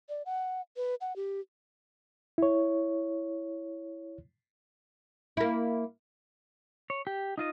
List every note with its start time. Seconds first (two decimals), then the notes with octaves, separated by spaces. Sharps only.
0.09 D5
0.26 F#5
0.77 B4
1.01 F#5
1.16 G4
2.38 E4 C#5
5.37 A#3 E4
6.90 C#5
7.07 G4
7.38 D#4 F4 D#5